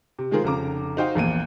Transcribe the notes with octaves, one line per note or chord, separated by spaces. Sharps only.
C3
D#3 G#3 F4 G#4 A#4 C5
F1 C#3 A#5 D6
D#4 F#4 C5 D#5 F5 G5
A#1 E2 A#3 D#7